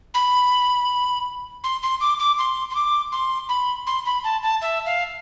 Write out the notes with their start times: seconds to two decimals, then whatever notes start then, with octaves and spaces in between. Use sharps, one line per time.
0.14 B5
1.64 C6
1.82 C6
2.01 D6
2.19 D6
2.38 C6
2.70 C6
2.75 D6
3.12 C6
3.49 B5
3.87 C6
4.05 B5
4.24 A5
4.42 A5
4.62 E5
4.86 F5